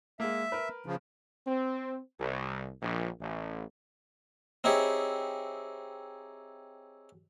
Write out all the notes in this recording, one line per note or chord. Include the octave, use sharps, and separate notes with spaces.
G#3 A#3 E5
A#4 B4
C#3 F3
C4
C2
A#1
A1
C4 D#4 E4 G4 G#4 C#5